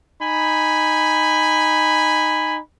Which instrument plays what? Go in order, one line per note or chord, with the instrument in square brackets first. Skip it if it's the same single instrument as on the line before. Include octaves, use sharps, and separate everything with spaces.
[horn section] D#4 G#5 B5